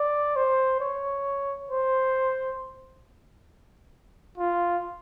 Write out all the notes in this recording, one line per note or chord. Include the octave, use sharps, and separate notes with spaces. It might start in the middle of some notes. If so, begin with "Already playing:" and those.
Already playing: D5
C5
C#5
C5
F4